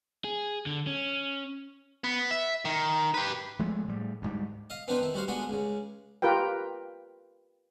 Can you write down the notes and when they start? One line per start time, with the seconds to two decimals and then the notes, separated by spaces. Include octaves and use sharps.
0.24 G#4
0.66 D3
0.87 C#4
2.04 B3
2.31 E5
2.65 D#3
3.14 G4 B4
3.59 F3 G#3 A3
3.88 A2 G3
4.22 D2 G#2 G3
4.70 D#5 F5
4.88 B3 C4 D4 D#4 B4 C5
5.00 D#3 E4
5.14 G3 F#4 C5 F5
5.28 G#3 B3 D4 F#4 G#4
5.49 C#2 C#3
6.22 F4 G4 A#4 B4 G5